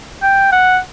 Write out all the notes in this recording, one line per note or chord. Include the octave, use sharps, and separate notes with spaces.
G5
F#5